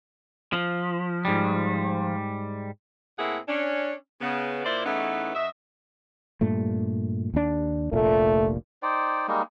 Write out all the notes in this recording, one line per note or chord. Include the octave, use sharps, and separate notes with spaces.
F3
G#2 G3
A2 A#3 C4 E4 G#4 F#5
C#4 D4
C#3 B3
A#2 A#3 E4 C5 D5
E2 E3 A3 B3 C#4 D#4
F#2 F#4 D#5 E5
G2 A#2 A3
D#2 D4
F1 A#1 A#2 A3
D#4 C5 D5 G5
G3 G#3 A#3 D#4